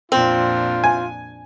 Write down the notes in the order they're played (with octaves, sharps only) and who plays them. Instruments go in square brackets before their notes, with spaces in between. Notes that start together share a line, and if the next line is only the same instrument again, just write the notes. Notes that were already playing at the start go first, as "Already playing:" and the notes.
[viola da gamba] F2 A#2 D4 [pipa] C4 [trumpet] F4
[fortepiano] G#5